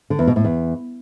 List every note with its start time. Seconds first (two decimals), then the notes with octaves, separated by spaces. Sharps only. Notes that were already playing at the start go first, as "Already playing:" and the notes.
0.10 D3
0.19 E2
0.27 B2
0.36 A2
0.45 E2